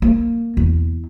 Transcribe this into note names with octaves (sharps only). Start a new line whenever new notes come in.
A#3
E2